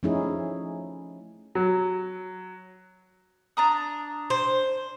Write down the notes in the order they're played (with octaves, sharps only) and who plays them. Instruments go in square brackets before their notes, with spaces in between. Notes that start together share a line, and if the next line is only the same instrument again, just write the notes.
[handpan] F3 A3 C#4 D#4 E4 G#4
[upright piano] F#3
[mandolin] D4 A#5 D#6
[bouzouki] C5